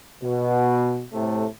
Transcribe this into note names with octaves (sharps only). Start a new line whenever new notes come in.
B2
A2 C3 A3